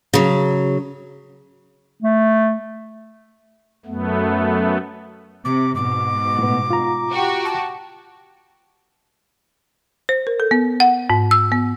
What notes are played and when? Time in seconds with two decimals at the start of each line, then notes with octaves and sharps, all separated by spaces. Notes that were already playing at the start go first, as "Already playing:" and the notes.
0.14 C#3 F#3
2.02 A3
3.86 F#2 A3 B3
5.45 C3 D6
5.75 G#2 B2 D6
6.39 A2 B3
6.70 F4 A#5
7.11 F#4 G4
7.45 A5
10.09 C5
10.27 A#4
10.40 A4
10.51 B3
10.80 F#5
11.10 G#2
11.31 E6
11.52 B3